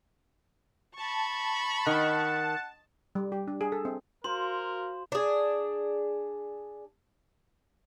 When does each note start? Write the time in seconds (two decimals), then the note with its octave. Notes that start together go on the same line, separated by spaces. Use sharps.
0.96 A5 B5 C#6
1.87 D#3 F#5
3.15 G3
3.32 G4
3.47 D4
3.61 G#4
3.72 A4
3.85 C4
4.24 F#4 A#4 C5 F5 C6
5.12 D4 G#4